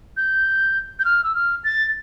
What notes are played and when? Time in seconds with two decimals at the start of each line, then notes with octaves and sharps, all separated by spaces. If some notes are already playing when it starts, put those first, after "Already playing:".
0.17 G6
0.99 G6
1.05 F6
1.24 E6
1.35 F6
1.64 A6